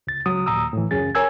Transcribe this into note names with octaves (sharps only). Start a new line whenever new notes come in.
C#2 A6
C#2 F#3 D#6
D#2 A#2 A#5 D#6 E6
A2 E3
C#2 F#2 C#4 G#4 A6
A#4 C#5 G#5 E6 G#6